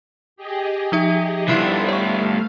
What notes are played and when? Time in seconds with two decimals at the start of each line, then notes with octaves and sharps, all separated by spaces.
0.36 G4 G#4 D#5
0.92 F3 D#4 E5
1.48 G2 B3 D4 E4 F4 A4 C5 D5
1.89 A3 C#5 F5 C#6